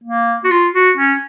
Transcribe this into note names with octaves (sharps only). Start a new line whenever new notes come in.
A#3
F#4
F4
F#4
C#4